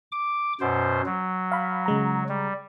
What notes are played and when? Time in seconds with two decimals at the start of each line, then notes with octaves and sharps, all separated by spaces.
0.12 D6
0.61 F#2 B2 C5
1.06 F#3
1.52 F5 B5
1.86 C#3 G#3 A#5
2.29 G3